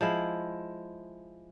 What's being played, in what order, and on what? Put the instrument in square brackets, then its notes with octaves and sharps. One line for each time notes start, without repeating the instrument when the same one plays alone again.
[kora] F3 G#3 E4